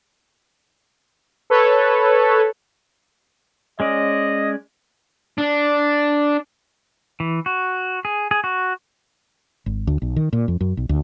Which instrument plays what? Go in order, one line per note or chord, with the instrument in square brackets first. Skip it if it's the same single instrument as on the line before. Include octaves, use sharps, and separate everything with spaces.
[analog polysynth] A4 B4 C#5
[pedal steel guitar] G#3 C#4 D5 [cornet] D#5
[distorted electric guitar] D4
[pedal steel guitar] E3
F#4
G#4
G#4
F#4
[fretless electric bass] G#1
D2
B1
D#3
A#2
F2
F#2
B1
D2